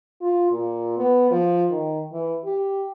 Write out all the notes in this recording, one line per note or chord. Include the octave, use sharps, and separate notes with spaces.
F4
A#2
B3
F3
D#3
E3
G4